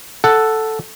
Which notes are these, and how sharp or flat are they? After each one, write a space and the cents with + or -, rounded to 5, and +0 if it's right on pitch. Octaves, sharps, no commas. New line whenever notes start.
A4 +0 F#5 +0